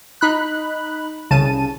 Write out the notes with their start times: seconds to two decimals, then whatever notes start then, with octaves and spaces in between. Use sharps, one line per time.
0.21 D#4 B5 F#6
1.31 C2 C#3 A5 D#7